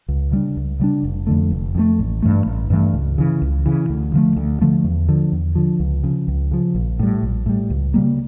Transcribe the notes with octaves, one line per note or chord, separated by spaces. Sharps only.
C#2
C#3 G3 D4
C#2
C#3 G3 D4
F1
F2 D3 A3
F1
F2 D3 A3
A1
G2 E3 A3
A1
G2 E3 A3
C#2
C#3 E3
C#2
C#3 E3
D2
D3 F3 A3
D2
D3 F3 A3
E2
D3 F3
E2
D3 F3
C#2
C#3 F3
C#2
C#3 F3
A#1
A2 G3
A#1
A2 G3
C#2
C#3 G3 A#3